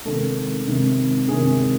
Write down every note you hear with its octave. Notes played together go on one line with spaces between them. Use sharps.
C3 D#3 G#3 A4
C3 D#3 G#3
C3 D#3 G#3 G#4